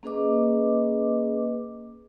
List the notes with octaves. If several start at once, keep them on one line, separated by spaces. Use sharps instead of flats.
A#3 C#4 G#4 B4 D#5 D6